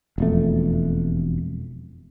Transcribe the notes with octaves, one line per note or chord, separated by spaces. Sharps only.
E1 F2 A3